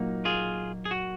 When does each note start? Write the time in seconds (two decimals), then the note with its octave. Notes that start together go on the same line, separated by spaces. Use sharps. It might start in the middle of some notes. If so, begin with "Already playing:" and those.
Already playing: A#2 F#3 A#3 D#4
0.25 F4 G#4
0.85 G#4
0.91 F#4